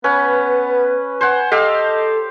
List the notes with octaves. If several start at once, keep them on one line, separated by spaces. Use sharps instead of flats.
B3 C#4 B4
C5 F#5 G#5
G4 A4 D#5 F5